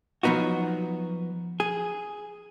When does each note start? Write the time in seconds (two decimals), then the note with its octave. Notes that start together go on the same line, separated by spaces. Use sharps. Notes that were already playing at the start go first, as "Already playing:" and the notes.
0.23 F3 F#3 B3 D#4 F#4
1.60 G#4